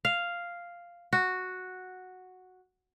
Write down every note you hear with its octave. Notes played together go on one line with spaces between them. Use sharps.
F5
F#4